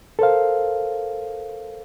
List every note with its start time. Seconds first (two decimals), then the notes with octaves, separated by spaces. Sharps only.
0.19 A4 A#4 C5 F5